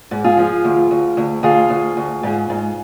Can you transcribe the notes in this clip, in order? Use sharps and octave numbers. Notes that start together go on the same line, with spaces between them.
G#2
F4 G#4
F3
D2
D2
D2
D2 F4 G#4
D2
D2
G#2
G#2